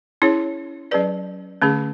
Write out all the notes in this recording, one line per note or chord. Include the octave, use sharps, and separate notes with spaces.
C#4 E4 G#4 C#5
F#3 C#4 G#4 B4 D5
D3 A3 C#4 G#4